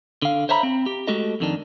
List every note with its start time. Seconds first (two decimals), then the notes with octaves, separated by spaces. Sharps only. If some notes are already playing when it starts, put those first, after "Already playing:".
0.22 D3 F5
0.49 C5 C#5 E5 A#5 B5
0.63 C4
0.86 G4
1.07 G#3 A3 F#4 G4 A4 D#5
1.40 F2 D#3 D4